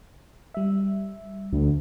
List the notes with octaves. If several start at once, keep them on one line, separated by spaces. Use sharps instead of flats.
G3 E5
D2